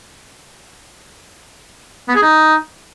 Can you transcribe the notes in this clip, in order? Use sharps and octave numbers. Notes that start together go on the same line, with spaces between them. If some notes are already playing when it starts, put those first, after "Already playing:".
B3
G#4
D#4